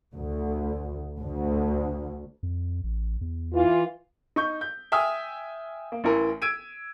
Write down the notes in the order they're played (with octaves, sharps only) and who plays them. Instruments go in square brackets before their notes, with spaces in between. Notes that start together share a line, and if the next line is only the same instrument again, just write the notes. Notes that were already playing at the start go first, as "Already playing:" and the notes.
[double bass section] D2
D2
[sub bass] F2
A1
E2
[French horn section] E3 F4
[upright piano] D#4 C#6 G6
G6
E5 G5 G#5 D#6 F6
A#3
A1 E3 A#4
E6 G#6 D7 D#7